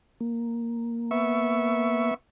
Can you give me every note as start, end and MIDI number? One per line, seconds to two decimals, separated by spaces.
0.21 2.11 58
1.11 2.14 59
1.11 2.14 76
1.11 2.14 85